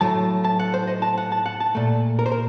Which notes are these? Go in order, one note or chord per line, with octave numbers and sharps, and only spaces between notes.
A2 F#3 A3 A5
A5
F#5
C5
D#5
A5
F#5
A5
F#5
A5
A#2 A3
A#4
C5
A#4